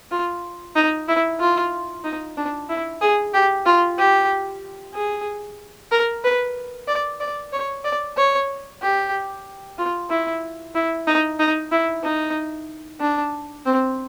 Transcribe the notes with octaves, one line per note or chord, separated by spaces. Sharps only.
F4
D#4
E4
F4
D#4
D4
E4
G#4
G4
F4
G4
G#4
A#4
B4
D5
D5
C#5
D5
C#5
G4
F4
E4
E4
D#4
D#4
E4
D#4
D4
C4